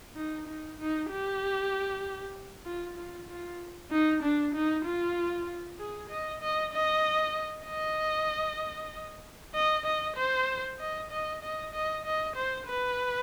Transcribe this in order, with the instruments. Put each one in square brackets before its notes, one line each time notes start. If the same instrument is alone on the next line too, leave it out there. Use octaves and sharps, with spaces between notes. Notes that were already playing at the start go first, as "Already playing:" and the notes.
[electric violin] D#4
D#4
D#4
G4
F4
F4
F4
D#4
D4
D#4
F4
G#4
D#5
D#5
D#5
D#5
D#5
D#5
C5
D#5
D#5
D#5
D#5
D#5
C5
B4